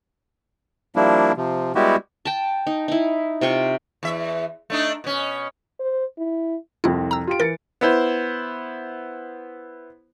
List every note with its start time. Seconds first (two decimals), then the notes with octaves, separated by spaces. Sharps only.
0.96 F3 G3 A#3 D4 E4
1.37 C3 F3
1.75 G3 G#3 B3 E4 F#4 G4
2.25 G5 A5
2.67 D#4
2.88 D#4 E4
3.41 C3 F4 G5 C#6
4.03 E2 E5
4.70 A3 D4 D#4
5.04 B2 C#4
5.79 C5
6.18 E4
6.84 C2 F2 C4 E4 F4
7.11 A#5 E6
7.27 F4 G4 D7
7.40 E3 A#4 A6 C#7
7.81 B3 E4 C5